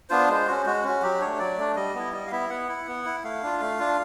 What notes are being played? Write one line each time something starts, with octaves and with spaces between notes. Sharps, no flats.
B3 D4 F4 C5
G#3 C5
C#4 F#4
G#3 F#4
C#4 F#4
F#3 G4
A3 D4 C#5
F#3 D5
A3 D4
G3 D#5
B3 E4
G3 D#5
F5
B3 E4 E5
B3 F#5
E4
B3
E4
A3 F5
D4 F4
A3
D4 F4